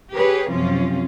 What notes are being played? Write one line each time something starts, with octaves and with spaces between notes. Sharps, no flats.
G4 G#4 B4 C#5
F#2 C3 F3 C#4 F4